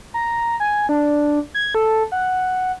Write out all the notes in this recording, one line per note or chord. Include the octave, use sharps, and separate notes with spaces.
A#5
G#5
D4
G#6
A4
F#5